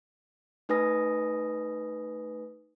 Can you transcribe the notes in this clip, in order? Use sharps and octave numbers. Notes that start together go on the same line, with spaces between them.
A3 D#4 B4 G#5 D#6 A#6